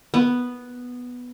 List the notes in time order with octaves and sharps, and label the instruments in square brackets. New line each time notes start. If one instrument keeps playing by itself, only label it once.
[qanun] B3